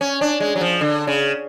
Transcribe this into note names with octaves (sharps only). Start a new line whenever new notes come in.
C#4
D4
G#3
F#3
F3
D3
C#3